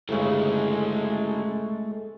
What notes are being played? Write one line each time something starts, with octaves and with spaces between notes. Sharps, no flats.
G1 C#3 G#3 A3 C#4 E4